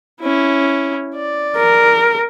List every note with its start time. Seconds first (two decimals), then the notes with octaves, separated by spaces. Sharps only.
0.20 C#4 E4
1.15 D5
1.57 A#4